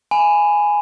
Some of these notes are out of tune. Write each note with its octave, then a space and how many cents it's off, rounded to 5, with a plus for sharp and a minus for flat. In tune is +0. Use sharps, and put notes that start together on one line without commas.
G#5 +0 B5 +20